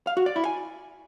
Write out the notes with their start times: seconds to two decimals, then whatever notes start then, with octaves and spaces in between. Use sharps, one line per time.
0.07 F5
0.17 F#4
0.26 D5
0.36 E4
0.45 G#5